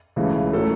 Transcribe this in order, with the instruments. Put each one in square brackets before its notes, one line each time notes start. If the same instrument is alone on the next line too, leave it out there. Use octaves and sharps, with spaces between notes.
[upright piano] C#2 C#3 E3 A3 E4
A2 F#3 C#4 A4